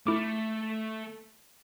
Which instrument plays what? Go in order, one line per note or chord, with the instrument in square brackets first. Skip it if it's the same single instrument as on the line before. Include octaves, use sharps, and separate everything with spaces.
[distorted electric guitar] A3 [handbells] E4 D6